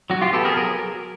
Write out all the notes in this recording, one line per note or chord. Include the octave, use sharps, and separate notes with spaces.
F#3 F#4
F4 G4
B3 G4 A4
G#4 A#4
F#3 G#4 A#4